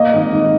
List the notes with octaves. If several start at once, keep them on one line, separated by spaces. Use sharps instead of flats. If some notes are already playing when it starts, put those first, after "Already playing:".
Already playing: A#3 D#5
G#1
G#2